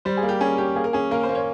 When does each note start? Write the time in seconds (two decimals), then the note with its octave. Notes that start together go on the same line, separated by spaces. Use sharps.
0.05 G3 C5
0.17 G#4
0.23 A#3
0.29 G4
0.41 C#4 G#4
0.58 C#4 G4
0.76 A#3 G#4
0.84 A#4
0.93 C#4 G#4
1.11 A#3 A#4
1.23 C5
1.29 A#3
1.35 C#5